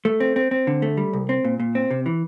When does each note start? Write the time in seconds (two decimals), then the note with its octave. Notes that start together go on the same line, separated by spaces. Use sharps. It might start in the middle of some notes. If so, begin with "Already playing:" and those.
0.05 A3
0.20 C4
0.36 C4
0.51 C4
0.67 D3
0.82 A3
0.97 G3
1.13 C2
1.29 C4
1.45 A#2
1.60 A#2
1.75 C4
1.91 C3
2.06 E3